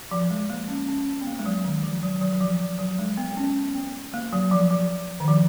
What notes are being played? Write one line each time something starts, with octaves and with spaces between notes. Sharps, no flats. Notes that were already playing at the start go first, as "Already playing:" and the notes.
F3
G#3
A#3
C#4
C#4
B3
A#3
G#3
F#3
D#3
F3
F#3
F#3
F#3
F3
F3
F#3
G#3
B3
B3
C#4
B3
A#3
F#3
F3
F3
D#3
F3